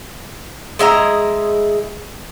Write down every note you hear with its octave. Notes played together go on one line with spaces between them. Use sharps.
G#3 E4 D#5 A#5